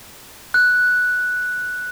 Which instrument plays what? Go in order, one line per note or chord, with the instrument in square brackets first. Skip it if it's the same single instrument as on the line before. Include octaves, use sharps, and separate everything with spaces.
[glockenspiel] F#6